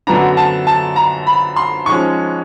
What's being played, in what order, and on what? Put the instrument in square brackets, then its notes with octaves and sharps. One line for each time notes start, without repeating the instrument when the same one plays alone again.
[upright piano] F#2 D3 F#3 B3 D4 A#5
A5
A5
A#5
B5
C6
G#2 F3 G#3 C#4 C#6